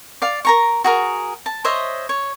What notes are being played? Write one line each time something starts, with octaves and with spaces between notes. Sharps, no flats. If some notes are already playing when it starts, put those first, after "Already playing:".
D5 F5
A#4 A#5 C#6
F#4 G#4 A#4
A5
C5 C#5 D#5 E5
C#5